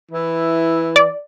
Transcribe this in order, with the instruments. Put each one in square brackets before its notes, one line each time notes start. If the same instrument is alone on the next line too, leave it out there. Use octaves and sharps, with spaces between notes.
[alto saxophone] E3 [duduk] E4
[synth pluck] D5